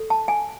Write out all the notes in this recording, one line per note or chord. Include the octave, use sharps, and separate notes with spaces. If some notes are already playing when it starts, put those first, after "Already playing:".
Already playing: A4
A5
G#5